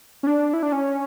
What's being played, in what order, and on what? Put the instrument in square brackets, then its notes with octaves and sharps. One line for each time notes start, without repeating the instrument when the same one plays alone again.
[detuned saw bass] C#4
D4
E4
D4
C#4